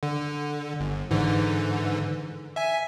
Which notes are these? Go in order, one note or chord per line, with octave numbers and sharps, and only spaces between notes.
D3
G1
G#2 D3 E3
E5 G#5